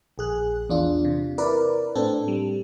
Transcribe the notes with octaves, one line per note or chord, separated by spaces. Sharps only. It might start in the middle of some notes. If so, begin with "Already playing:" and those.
A#1 G#4 F#6
E2 D4 F4
C3
E4 A#4 B4 D5
A2 C4 D4 A4
G3